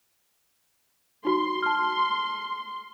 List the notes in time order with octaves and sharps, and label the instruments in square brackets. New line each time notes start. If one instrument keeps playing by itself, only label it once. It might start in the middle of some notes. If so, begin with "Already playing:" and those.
[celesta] D#4 F#4 [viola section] C6
[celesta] A5 F6